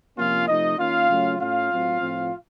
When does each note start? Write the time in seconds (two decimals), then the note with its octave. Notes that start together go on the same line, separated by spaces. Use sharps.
0.17 C3 F3 A#3 C#4 F4 F5
0.48 C3 F3 A3 D#4 D#5
0.78 D#3 A#3 C#4 F4 F5
1.09 C#3 F#3 A3 C#4
1.39 A2 A3 C#4 F4 F5
1.70 A2 F#3 C4
2.00 A2 F3 C4